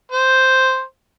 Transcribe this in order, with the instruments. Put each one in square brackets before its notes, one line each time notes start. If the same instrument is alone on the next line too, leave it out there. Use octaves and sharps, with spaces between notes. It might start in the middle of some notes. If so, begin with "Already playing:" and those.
[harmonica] C5